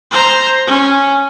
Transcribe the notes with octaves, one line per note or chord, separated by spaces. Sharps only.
C5 A#5
C#4